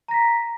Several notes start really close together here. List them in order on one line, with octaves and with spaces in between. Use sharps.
A#5 A#6 B6